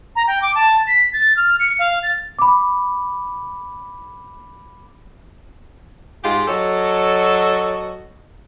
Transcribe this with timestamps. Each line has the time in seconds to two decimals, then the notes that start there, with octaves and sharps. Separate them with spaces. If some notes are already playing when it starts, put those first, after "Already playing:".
0.16 A#5
0.27 G5
0.42 D6
0.55 A5
0.87 B6
1.13 A6
1.37 F6
1.60 C#7
1.79 F5
2.03 A6
2.39 B5 D6
6.23 G#2 F4 G4 G#4
6.47 F#3 F#4 A4 C#5 D#5